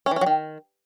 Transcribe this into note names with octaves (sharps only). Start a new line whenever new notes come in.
C#4
E3
C#4
F#3
D#3